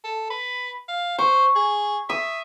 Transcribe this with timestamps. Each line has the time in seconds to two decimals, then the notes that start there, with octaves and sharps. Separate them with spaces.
0.04 A4
0.30 B4
0.89 F5
1.19 C5 C#6
1.56 G#4
2.10 E5 D#6